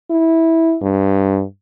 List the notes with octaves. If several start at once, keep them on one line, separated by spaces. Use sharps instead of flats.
E4
G2